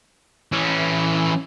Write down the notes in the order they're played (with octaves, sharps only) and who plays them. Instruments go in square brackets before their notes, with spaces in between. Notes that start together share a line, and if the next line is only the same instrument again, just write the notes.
[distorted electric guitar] E3 C#4